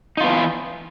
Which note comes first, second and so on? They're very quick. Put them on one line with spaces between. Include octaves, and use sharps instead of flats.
D#4 F4 B3 E3